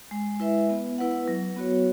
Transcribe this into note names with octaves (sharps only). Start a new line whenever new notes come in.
G#3
E4 B4 E5
B3
E4 B4 F#5
F#3
B3 F#4 C#5